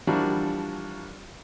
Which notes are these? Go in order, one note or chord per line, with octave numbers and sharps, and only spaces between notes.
E3 F3 G3 D4 F#4 A#4